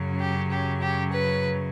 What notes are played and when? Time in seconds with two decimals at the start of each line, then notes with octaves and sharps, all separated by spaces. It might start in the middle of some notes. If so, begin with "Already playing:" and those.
Already playing: F#2 C#3 F#3
0.20 G4
0.51 G4
0.81 G4
1.12 B4